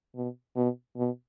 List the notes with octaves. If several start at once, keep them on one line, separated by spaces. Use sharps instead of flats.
B2
B2
B2